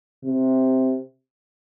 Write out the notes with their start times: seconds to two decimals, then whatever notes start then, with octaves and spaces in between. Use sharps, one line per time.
0.24 C3